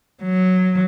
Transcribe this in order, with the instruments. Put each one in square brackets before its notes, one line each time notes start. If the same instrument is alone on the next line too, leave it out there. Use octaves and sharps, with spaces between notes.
[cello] F#3